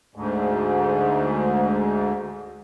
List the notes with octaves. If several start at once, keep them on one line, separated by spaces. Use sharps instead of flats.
D2 G#2